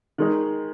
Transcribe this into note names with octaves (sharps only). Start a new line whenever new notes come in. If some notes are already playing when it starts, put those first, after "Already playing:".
D#3 G#3 D#4